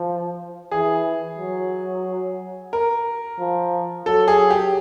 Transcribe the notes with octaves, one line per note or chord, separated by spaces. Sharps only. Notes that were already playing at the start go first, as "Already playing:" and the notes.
Already playing: F3
E3 G#4
F#3
A#4
F3
F#3 A4
G#4
G4